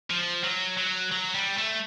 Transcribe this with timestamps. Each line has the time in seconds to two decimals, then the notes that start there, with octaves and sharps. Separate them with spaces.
0.10 F3
0.43 F#3
0.77 F#3
1.12 F#3
1.35 G3
1.57 A3